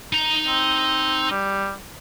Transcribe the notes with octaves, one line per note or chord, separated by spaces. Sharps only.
D#4 A#5
C4
G3